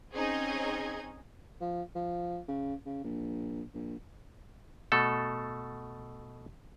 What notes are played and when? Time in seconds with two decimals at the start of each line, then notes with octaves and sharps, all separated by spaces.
0.12 C4 C#4 D#4 G#4 D#5 G#6
1.61 F3
1.95 F3
2.48 C#3
2.86 C#3
3.04 A#1
3.74 A#1
4.92 B2 A3 A4